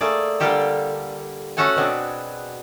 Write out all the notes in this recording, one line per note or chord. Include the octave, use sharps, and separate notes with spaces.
A3 A#3 G#4 D5
D3 G3 A#3 F4 G4 A4
A3 C#4 F#4 A4 F#5 G#5
B2 B3 C4 D4 G#4